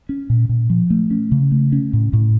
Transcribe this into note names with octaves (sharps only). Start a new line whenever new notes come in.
C#4
A#2
A#2
F3
A3
C#4
C#3
A3
C#4
A2
A2